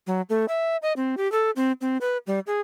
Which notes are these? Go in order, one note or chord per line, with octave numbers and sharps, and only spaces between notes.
F#3
A3
E5
D#5
C4
G4
A4
C4
C4
B4
G3
G#4